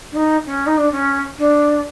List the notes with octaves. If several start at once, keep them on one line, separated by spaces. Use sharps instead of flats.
D4
D#4
C#4
D#4
D4
C#4
D4